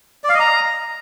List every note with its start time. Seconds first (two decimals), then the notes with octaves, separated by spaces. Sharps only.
0.24 D5
0.29 F5
0.34 D#5
0.40 A#5